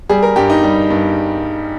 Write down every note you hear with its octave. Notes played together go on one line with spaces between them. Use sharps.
G3 G#4
A#4
G2 G4
D#4
G3
G2